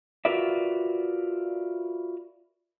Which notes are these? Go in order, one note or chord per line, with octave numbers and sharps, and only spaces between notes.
F4 F#4 A#4 B4 D5 E5